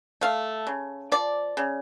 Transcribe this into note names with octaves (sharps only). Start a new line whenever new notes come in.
A3 F5
C#3
F3 D5
C#3